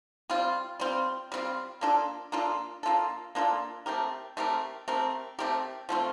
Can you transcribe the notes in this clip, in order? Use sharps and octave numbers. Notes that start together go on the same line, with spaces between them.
G3 C4 F4
G3 C4 F4
G3 C4 F4
A#3 D4 F4 A4
A#3 D4 F4 A4
A#3 D4 F4 A4
A#3 D4 F4 A4
A3 C4 G4 A#4
A3 C4 G4 A#4
A3 C4 G4 A#4
A3 C4 G4 A#4
F3 A3 C4 F4